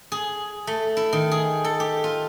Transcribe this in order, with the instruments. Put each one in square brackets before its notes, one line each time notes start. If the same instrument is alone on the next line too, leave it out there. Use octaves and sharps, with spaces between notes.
[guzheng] G#4
A3
E4
D#3
G#4
A4
G4
F4